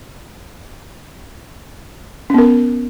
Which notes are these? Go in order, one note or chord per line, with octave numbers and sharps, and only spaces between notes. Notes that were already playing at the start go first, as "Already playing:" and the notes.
B3 C#4 A#4